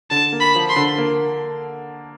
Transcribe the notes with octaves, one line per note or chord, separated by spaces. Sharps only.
D3 A5
A#3
B5
F3
C6
D3
A#3